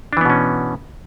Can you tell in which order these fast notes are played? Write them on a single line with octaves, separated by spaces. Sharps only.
D4 E3 B3 B2 C#4